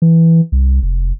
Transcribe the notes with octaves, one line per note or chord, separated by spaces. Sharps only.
E3
C2
F1